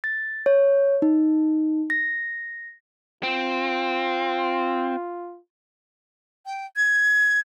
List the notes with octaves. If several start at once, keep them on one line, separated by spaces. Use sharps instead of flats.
A6
C#5
D#4
A#6
C4 F4
G5
G#6